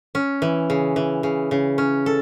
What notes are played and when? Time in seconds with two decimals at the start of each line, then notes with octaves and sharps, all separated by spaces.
0.15 C#4
0.42 E3
0.70 C#3
0.96 E3
1.23 C#3
1.51 C#3
1.78 C#4
2.06 A4